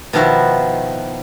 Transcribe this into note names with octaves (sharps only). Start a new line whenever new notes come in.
B2 D#3 F3 B3 E4 F#4